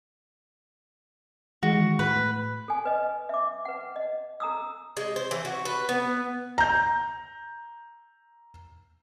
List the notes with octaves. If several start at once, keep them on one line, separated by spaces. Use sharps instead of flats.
D#3 E3 G#3 F#4
A2 B4
A4 G#5
B4 D#5
E5 D6
B4 F#5
D#5
A4 A#5 D#6 E6
G#3
C5
E3
F#4
B4
B3
A#5 G6